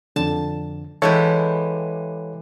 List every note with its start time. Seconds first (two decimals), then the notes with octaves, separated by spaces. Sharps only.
0.16 F2 D3 A5
1.02 E3 G#3 G4 A4 C#5 F5